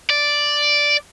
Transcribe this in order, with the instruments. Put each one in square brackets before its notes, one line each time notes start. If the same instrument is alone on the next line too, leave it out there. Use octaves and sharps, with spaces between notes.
[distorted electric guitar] D5